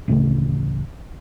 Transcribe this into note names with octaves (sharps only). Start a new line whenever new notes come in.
A1 D2 C#3 A3